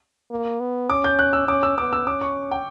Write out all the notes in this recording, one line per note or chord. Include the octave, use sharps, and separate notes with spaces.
A#3
B3
C#4 D6
G6
F#6
E6
C#4 D6
E6
B3 D6
E6
C#4 D6
C#6
G5